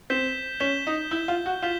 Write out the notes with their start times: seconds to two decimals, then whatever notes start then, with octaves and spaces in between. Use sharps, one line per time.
0.10 C4 G6 B6 E7 G7
0.60 C#4 G6 B6 E7 G7
0.87 D#4
1.11 E4 G6 B6 E7 G7
1.28 F4
1.46 F#4
1.62 F4 G6 B6 E7 G7